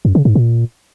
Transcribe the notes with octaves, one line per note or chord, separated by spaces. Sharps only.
F#2
C#3
G#2
A#2